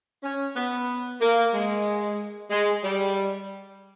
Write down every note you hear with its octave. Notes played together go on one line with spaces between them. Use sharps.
C#4
B3
A#3
G#3
G#3
G3